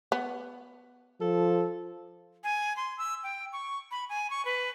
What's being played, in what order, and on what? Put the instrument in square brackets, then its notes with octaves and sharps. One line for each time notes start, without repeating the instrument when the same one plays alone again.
[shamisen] B3
[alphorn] F3 [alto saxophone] A4
[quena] G#5
C6
E6
G5
C#6
B5
G#5
C#6
B4